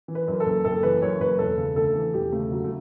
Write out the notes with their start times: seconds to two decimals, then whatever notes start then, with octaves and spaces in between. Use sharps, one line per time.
0.08 E3
0.15 B4
0.28 F#2
0.40 A4
0.45 F#1
0.65 F#1 A4
0.83 E3 B4
1.02 F#2 C#5
1.20 F#1 B4
1.39 E1 A4
1.58 C#3
1.76 D2 A4
1.95 E3
2.14 E1 G4
2.32 C#3 A3
2.51 D2 F#3
2.64 A3